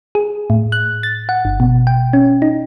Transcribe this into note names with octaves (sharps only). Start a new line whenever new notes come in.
G#4
A2
F#6
A6
F#5
G1
B2
G5
C#4
D#4